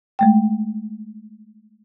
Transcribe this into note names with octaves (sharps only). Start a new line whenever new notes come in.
G#3 A3 G5